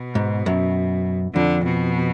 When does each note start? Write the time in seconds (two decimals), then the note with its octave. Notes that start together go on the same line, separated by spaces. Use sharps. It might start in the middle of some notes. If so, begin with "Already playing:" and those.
Already playing: B2
0.15 G#2
0.46 F#2
1.34 F2 D3
1.64 B2